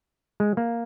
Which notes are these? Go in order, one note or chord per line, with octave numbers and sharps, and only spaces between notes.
G#3
A#3